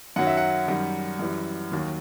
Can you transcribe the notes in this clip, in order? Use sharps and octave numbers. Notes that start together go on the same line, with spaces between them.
F#2 D#3 F#3 F#5
E5
F#5
F#2 D#3 G3
F#2 E3 G3
D#2 D#3 F#3